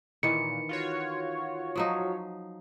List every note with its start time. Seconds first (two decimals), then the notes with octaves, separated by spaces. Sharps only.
0.23 A#2 D#3 E3 C#7
0.69 F4 F#4 C#5
1.76 F3 F#3 D#4